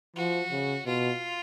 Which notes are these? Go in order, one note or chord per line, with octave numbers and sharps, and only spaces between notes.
F3 F#4
C#3
B2 F4